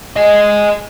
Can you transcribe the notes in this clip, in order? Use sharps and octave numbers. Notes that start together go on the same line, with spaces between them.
G#4 D#5